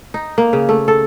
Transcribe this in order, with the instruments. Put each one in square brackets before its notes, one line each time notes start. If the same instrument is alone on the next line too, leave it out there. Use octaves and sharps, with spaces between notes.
[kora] D#4
A#3
C#3
A3
A4